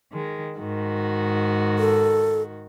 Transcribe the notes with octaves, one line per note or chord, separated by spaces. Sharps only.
D#3 G#3
G#2 D#3 F#4
A4